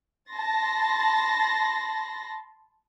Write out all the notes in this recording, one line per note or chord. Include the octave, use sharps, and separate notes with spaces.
A5 B5 C6 A6 A#6